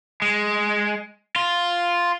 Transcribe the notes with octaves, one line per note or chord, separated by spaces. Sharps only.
G#3
F4